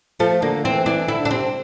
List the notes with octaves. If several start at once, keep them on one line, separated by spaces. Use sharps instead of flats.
F3 A3
D3 A#3
E3 C4
E3 D4
D3 E4
D3
D4
C3 C4